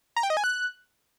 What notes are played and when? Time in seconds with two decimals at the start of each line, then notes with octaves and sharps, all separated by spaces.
0.16 A#5
0.23 G5
0.30 D#5
0.37 G#5
0.44 F#6